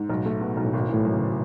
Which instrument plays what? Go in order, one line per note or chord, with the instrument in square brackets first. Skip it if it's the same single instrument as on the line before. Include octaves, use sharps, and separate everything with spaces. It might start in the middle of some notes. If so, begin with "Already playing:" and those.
Already playing: [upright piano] G#2
[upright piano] B1 [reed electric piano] A2
[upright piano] A3
B2
B1
[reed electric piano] A2
[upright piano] G#1 [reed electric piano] B2
[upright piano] E3
[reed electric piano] A2
[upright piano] F#2
[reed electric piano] C#3